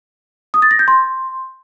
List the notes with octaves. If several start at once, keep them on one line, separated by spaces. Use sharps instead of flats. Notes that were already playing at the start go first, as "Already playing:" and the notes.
D#6
A6
A#6
G6
C6